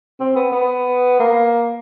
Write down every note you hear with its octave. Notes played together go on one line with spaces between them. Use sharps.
C4
B3
B3
A#3